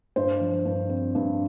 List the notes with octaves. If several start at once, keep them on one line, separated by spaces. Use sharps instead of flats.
G2 C5
F3
G2
C4
G2